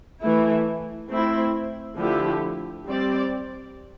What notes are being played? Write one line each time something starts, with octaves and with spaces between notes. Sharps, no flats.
E3 A3 E4
A3 C4 E4
D3 F3 A3 E4 G4
G3 C4 G4 D5